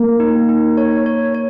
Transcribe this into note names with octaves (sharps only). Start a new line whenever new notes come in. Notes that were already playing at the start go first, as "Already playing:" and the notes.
Already playing: A#3
D#4
D#4
C#5
C#5
C#5